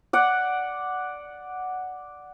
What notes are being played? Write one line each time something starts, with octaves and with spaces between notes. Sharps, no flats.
D5 F#5